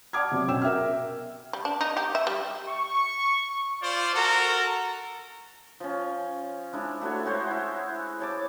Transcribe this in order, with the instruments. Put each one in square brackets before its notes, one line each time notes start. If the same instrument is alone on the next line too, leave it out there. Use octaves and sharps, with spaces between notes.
[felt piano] D5 F#5 A5 D6 F6 G#6
C3 F#3
B2 C#4 G5 E6 E7
A#4 E5 G5 F6
[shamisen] G3
D4
D#4
G4
E5
G3
[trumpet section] C#6
F4 C5 D5
F#4 A4 A#4 A#5
[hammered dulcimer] F3 C#4
G#3 D4 E4
A3 F#4 A4 C#5
G#3 F#4 C5 C#5
E4
C#5 A5 D6